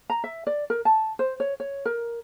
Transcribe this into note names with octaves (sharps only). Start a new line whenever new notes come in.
A#5
E5
D5
A#4
A5
C5
C#5
C#5
A#4